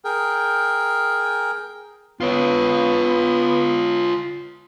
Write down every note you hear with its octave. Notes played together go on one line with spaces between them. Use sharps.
G#4 A#4 G5
B3 F4 C#5